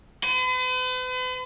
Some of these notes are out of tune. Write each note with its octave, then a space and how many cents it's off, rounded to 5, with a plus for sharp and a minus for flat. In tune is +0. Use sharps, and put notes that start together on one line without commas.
B4 +45